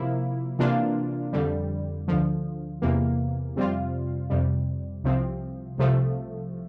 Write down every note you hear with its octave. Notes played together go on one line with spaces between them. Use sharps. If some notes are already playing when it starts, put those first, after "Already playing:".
Already playing: C3 F3 A#3 E4
C3 E3 A#3 D4 F4
F2 D3 G3
D2 D3 F3
E2 C3 E3 A#3
F2 C3 G3 C4 F4
F2 C3 G3
C2 C3 F3 C4
C2 C3 F3 A3